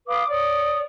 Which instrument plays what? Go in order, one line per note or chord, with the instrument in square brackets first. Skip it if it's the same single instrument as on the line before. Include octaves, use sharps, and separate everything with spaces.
[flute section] B4 F5 D6 D#6
C#5 D5 D#6